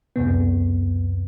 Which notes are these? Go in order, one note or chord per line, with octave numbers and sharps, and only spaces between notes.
C#2 F#2 C3 B3